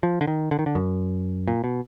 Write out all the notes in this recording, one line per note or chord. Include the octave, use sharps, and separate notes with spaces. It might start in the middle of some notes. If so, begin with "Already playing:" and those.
F3
D3
D#3
D3
D#3
D3
F#2
A#2
B2